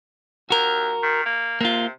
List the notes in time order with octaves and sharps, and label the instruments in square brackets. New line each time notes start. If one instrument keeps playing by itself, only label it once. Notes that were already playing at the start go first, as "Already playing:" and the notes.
[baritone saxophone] D#2 [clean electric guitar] F#4 A#4
[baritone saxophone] D#3
A#3
[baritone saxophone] C3 [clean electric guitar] A#3 F4